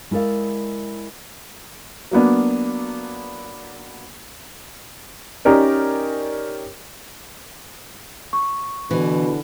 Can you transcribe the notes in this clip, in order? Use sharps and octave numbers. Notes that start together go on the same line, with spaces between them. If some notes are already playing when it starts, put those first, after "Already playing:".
G#3 E4 A#4 D5 F5
F#3 A#3 B3 D4
C#4 D#4 G4 A#4 D5
C#6
B2 D3 E3